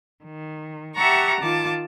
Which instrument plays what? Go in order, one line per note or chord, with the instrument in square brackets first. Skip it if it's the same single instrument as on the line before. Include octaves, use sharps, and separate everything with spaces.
[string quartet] D#3
G4 E5 F#5 A5 A#5 C#6
D#3 F4 A5 D6